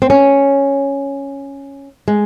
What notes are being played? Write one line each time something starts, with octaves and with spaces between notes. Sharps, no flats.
C4
C#4
G#3